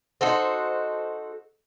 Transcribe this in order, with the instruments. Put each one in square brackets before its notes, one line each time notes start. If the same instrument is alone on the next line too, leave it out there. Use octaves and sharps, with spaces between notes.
[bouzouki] D#4 F#4 A4 C5